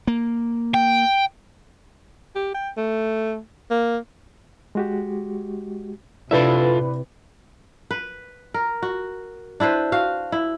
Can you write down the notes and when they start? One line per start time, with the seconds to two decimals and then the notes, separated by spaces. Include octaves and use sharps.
0.07 A#3
0.74 G5
2.35 G4
2.54 G5
2.77 A3
3.70 A#3
4.75 G#3 F#4 G4
6.31 C3 D4 E4 F4 A4 B4 E5
7.91 B4
8.54 A#4
8.82 F#4
9.60 D4 E4 B4 C5
9.92 F#4 F5
10.32 E4